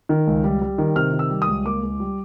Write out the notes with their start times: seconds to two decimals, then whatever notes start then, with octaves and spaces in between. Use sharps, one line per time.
0.09 D#3
0.27 C#2
0.44 G3
0.62 G3
0.78 D#3
0.96 C3 F6
1.13 D#3
1.19 E6
1.30 G3
1.42 D#6
1.48 C#2
1.65 A#3 D6
1.83 C#2
2.00 G3